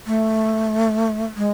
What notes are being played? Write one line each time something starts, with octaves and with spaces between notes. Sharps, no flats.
A3
G#3